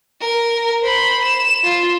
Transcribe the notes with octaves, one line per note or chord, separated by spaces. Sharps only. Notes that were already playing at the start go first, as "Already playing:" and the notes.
A#4
C5 B5
E7
F4